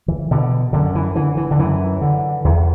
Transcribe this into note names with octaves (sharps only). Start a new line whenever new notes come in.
E3
B2 D3
F#2 D3
E3
D3 E3
E3
D3
F#2 E3
D3
E2